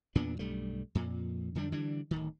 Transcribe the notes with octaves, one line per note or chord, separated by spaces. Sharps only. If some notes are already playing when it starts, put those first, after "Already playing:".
E2 A#2 B3 D4
B1 G2 G3 A3
F2 A#2
F2 D3 G3 D4
D3 E3 G3 D4
D1 D#3